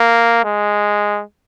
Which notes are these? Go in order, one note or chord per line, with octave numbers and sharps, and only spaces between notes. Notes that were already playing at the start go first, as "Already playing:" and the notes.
Already playing: A#3
G#3